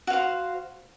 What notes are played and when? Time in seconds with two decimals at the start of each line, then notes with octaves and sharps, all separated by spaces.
0.07 F#4
0.10 F5
0.13 C5